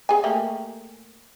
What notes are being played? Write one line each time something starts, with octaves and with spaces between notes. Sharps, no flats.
G#4 G#5
A3 A#3 G4